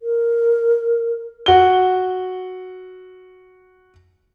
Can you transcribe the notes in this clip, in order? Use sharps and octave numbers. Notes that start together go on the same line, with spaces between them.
A#4
F#4 G7